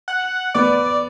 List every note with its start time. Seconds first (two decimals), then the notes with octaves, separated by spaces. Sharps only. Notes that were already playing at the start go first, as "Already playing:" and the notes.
0.08 F#5
0.54 B3 D5